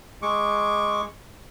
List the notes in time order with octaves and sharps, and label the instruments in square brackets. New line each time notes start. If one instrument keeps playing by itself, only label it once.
[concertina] G#3 C#6 D6